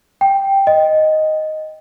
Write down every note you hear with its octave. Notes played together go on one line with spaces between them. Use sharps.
G5
D#5